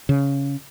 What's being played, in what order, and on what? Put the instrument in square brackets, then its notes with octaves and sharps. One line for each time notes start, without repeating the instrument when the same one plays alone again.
[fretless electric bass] C#3